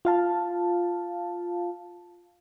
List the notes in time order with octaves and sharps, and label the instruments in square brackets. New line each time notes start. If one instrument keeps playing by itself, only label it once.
[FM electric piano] F4 F5 A5